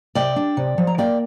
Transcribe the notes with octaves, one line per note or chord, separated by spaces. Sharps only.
C3 D5 G5
D4
C3
F3
A#5
A#3 D5 G5